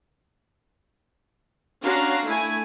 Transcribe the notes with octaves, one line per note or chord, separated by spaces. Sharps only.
C#4 D4 F#4 F5 A#5 C6
A3 E4 G#5